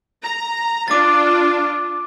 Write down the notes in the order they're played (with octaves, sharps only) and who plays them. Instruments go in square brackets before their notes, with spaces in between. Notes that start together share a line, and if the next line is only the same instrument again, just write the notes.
[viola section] A#5
[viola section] D4 F4 [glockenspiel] D6 A6